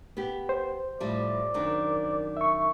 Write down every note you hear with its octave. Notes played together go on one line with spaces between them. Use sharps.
B3 G4
C5
A2 F3 G3 D5
F#2 D#3 D4
E5 C#6